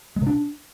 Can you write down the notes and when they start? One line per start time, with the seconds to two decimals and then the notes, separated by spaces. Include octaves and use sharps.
0.16 G#3
0.22 C3
0.27 D4